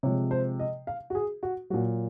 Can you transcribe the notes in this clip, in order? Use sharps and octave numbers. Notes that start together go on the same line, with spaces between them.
C3 F3 G#3 C#5
C5
D#5
F5
F#4
G#4
F#4
A#2 F#3 F#4